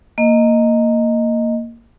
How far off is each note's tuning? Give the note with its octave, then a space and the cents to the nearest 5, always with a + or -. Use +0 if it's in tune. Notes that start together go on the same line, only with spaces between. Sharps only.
A#3 -10 D#5 +0